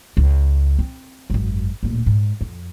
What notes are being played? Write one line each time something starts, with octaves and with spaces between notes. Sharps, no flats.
C#2
C4
G#1 F#2
D1 A#2
G#2
F2